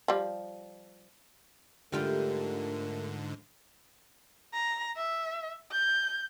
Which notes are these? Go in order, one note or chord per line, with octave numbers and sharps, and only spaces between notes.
F3 G3
G#2 D3 G3 A3 F4 A#4 G5
A#5
E5
G6